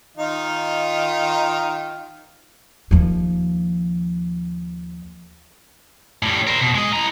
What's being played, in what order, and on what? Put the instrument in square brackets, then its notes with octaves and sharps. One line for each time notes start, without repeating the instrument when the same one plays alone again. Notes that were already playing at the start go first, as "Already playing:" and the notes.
[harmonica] D#3 D#4 F4
[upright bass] D#2 F3
[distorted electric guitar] A2 G3
A#4 C5
B2
G#3 D#5
E4 A#5